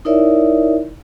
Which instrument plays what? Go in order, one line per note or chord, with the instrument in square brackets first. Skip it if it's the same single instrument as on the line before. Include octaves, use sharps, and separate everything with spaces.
[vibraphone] D#4 E4 A#4 C#5 D5 E5